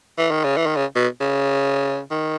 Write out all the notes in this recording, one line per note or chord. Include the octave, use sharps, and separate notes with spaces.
E3
D#3
C#3
E3
D#3
C#3
B2
C#3
D#3